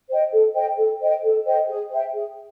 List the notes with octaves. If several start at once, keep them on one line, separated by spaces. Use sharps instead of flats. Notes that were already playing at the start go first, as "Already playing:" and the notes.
C5 D#5 G5
A4
C5 D#5 G5
A4
C5 D#5 G5
A4
C5 D#5 G5
G#4
C5 E5 G5
G#4